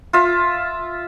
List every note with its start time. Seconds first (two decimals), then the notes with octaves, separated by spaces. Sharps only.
0.13 F4 E5